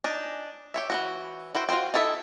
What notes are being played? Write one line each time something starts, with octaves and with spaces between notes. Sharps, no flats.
D4 D#4 G#5
G4 C#5 E5
E3 F#3 F#4
E4 F#4 C5 G5
F4 F#4 B4 C5 G5
D#4 E4 A4 C#5 E5